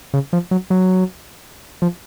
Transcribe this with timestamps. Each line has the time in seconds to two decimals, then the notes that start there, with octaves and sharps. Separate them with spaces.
0.14 C#3
0.33 F3
0.51 F#3
0.70 F#3
1.82 F3